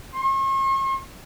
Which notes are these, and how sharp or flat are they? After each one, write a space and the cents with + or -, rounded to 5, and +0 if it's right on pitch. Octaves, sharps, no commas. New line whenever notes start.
C#6 -45